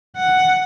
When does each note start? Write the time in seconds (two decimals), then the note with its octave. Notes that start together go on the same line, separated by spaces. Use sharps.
0.16 F#5